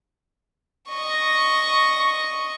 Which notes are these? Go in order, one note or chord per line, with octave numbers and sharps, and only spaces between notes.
D#5 C#6